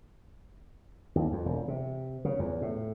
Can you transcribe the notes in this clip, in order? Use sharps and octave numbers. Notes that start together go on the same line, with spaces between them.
D#2
F2
E1
C3
C#3
E2
A2